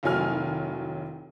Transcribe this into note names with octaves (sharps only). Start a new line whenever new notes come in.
F1 D#2 A2 F#3 G#5 F6